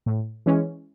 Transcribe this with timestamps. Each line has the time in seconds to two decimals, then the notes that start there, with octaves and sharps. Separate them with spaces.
0.06 A2
0.46 E3 G#3 C#4